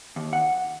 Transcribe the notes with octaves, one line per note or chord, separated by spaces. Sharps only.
D#2
F#5